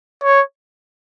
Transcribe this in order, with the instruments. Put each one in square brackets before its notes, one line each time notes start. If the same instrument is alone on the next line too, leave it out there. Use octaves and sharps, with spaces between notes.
[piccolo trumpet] C#5